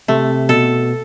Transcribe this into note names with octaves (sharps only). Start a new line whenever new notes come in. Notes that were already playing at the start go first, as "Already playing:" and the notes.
C3 A3
B2 A4